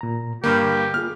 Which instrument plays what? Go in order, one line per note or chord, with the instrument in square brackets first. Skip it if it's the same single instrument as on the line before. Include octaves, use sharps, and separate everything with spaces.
[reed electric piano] A#2 A#5
[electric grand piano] G2 A#3 [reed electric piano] D3 B5 F6 [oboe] G4
[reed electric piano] A#3 F4 G#4 [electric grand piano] F6